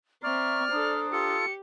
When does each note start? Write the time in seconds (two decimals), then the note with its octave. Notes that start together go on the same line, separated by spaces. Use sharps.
0.23 C4 D5 E5 A#5 C#6 F6
0.72 D4 A4 C5 A#5 D#6
1.12 F4 G4 A4 C#7